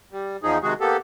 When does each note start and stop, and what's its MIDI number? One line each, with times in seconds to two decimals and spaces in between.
0.12 0.37 55
0.43 0.58 40
0.43 0.58 53
0.43 0.58 63
0.43 0.58 68
0.63 0.74 48
0.63 0.74 51
0.63 0.74 56
0.63 0.74 66
0.63 0.74 68
0.80 0.97 58
0.80 0.97 59
0.80 0.97 67
0.80 0.97 69